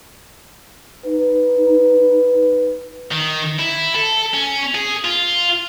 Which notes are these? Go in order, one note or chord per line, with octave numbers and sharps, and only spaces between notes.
D#4 B4
D#3
E4
A4
C#4
G#4
F4